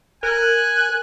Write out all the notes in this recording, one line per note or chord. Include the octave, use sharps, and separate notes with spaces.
A#4 G#5 F#6